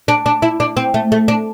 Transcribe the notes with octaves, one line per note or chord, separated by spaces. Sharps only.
D4
D4
E4
D4
C4
A3
A3
D4